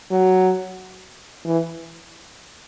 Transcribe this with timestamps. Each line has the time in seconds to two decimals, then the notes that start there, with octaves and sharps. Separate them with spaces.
0.10 F#3
1.45 E3